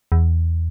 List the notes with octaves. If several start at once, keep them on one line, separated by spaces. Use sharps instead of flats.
E2